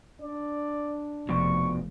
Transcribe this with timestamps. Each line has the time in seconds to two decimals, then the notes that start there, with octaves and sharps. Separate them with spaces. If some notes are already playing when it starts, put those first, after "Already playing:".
0.21 D4 D5
1.29 F1 B2 F3 D5 C#6